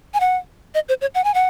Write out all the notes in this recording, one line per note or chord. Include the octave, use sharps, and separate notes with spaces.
G#5
F#5
D#5
C5
C#5
F#5
G#5
F#5